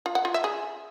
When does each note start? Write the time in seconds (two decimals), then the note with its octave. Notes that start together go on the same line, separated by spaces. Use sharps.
0.06 F4
0.15 F#5
0.25 F4
0.34 E5
0.44 G#4